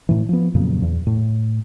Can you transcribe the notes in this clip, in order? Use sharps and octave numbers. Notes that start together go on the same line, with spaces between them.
A2 E3
F3 B3
F2 A#2 C#3 F#3
E2
A2